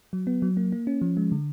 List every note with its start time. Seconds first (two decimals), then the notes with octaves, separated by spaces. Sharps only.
0.13 F#3
0.27 B3
0.42 F#3
0.57 A#3
0.72 A#3
0.87 C#4
1.01 F3
1.17 G#3
1.32 D3